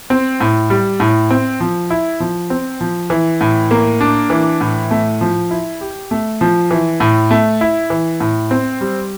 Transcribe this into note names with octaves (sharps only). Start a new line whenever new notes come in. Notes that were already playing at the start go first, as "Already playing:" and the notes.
C4
A2
G3
A2
C4
F3
E4
F3
C4
F3
E3
A2
A#3
D4
E3
A2
A3
F3
E4
G4
A3
F3
E3
A2
A3
E4
E3
A2
C4
G3